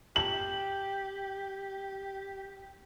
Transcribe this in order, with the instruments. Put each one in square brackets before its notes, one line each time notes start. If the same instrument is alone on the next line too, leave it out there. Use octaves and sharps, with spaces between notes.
[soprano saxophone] G4 [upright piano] F#7